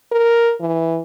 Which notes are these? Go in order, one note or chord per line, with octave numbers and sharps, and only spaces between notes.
A#4
E3